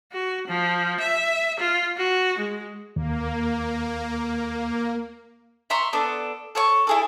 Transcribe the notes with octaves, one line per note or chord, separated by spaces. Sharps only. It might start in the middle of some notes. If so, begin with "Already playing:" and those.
F#4
F3
E5
F4
F#4
G#3
D#2 A#3
E5 A#5 C6 C#6
B3 D4 A4
A4 C#5 C#6
E4 G#4 A4